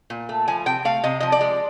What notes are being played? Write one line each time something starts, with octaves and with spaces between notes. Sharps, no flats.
A#2
A3
F3 G#5
C3 G5
A3 F5
C3 D#5
F3 D#5
D5
G#3